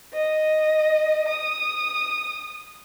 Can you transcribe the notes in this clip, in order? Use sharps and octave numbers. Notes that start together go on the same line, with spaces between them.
D#5
D#6